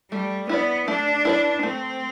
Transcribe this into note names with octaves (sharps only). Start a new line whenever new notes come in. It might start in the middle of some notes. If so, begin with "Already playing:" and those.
G3 A3
B3 E4 B4 D5
A3 D4
E4 B4 D5
A3 C4